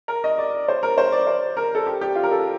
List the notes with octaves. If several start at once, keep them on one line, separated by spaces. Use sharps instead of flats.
A#4
D#5
D5
C5
A#4
C5
D5
C5
A#4
A4
G4
G4
F4
A#4
A4